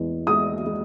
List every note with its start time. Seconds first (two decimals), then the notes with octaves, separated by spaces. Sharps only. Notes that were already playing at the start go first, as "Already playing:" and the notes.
Already playing: E2 G#3
0.27 G#3 D#6
0.65 G#3